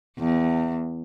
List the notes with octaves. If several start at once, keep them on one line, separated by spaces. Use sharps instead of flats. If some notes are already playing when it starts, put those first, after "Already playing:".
E2